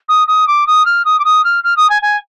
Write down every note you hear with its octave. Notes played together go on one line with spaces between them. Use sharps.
D#6
D#6
D6
D#6
F6
D#6
D6
D#6
F6
F6
D#6
G#5
G#5